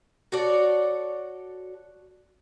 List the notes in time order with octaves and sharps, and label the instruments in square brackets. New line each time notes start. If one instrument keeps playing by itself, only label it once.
[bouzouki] F#4 A4 C#5 D5